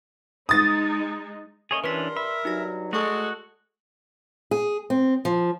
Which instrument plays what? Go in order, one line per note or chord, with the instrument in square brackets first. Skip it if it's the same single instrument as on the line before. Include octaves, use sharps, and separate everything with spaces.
[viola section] G#3 D#4 [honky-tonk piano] D#6 A6
[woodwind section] A3 C#4 [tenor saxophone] A#3 [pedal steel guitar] G#4 C#5 D#5
[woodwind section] G2 C6 [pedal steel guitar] E3 C#4 D4 [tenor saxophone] A#4 [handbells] B4 B6
[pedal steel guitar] E5 [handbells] B5
[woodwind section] G2 B2 F#3 [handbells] D#4 F#4 A#6
[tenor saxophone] G#3 [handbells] A3 C#6 [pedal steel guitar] F#4 [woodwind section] A4
[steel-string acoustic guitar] G#4
C4
F3